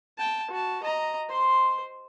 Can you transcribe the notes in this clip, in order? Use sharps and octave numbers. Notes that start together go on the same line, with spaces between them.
G5 A5
F#4 A5
D#5 A#5
C5 C6